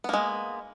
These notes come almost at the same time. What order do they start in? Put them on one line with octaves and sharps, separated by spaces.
B3 A#3 G#3